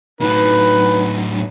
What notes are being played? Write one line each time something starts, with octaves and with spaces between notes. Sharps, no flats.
A2 F#3 D#4 B4